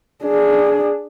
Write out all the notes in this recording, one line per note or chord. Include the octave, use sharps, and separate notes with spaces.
D4 G#4